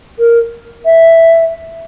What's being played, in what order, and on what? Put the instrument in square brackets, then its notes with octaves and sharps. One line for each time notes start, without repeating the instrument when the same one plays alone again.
[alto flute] A#4
E5